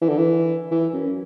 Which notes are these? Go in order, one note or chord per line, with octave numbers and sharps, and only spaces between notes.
E3
D3
E3
E3
F#2